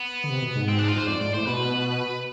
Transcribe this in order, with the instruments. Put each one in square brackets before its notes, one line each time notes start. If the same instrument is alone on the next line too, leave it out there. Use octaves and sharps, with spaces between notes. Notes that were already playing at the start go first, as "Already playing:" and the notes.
Already playing: [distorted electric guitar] B3
[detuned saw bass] D3
C3
B2
G#2
[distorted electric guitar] C4
D4
F4
[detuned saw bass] G#2 [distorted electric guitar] C5
[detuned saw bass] F2 [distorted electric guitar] D5
[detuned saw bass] G#2 [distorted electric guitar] D5
[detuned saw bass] A2 [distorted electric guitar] C5
[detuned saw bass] B2 [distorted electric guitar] B4